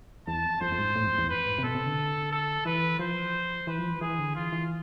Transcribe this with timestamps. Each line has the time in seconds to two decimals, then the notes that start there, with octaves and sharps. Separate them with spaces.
0.27 E2 A5
0.44 F2
0.61 F2 C5
0.72 F2
0.78 G#2
0.96 A2
1.07 F2
1.18 E2
1.29 F2 B4
1.46 G#2
1.58 C3
1.63 B2 A4
1.75 C3
1.86 D3
2.32 A4
2.65 E3 B4
2.99 F3 C5
3.67 E3 B4
3.79 F3
3.90 E3
4.01 E3 G#4
4.19 D3
4.35 E3 F4
4.52 E3